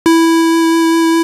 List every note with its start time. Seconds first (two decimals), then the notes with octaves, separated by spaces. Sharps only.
0.06 E4